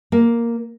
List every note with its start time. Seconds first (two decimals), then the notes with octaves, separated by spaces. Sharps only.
0.12 A#3